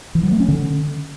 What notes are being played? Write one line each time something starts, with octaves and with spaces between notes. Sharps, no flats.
E3
F#3
A3
C#4
D3